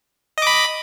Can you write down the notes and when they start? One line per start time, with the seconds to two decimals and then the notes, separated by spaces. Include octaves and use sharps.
0.38 D#5
0.42 D6
0.47 B5